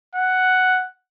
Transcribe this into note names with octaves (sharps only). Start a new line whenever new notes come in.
F#5